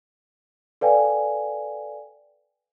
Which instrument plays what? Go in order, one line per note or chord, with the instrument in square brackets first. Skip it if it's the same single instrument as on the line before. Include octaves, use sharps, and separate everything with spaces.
[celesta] A4 B4 D5 F5 G5 G#5